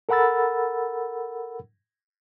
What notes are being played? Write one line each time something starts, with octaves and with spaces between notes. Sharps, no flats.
A4 A#4 F#5 B5 E6 A6